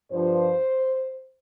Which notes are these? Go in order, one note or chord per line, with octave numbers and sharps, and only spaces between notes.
G2 F3 C5